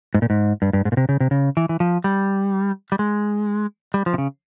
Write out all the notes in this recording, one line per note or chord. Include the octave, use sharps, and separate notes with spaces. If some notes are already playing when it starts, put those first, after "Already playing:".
G#2
A#2
G#2
G2
G2
G#2
A#2
C3
C#3
C3
C#3
E3
E3
F3
G3
G3
G#3
G3
F3
C3
C#3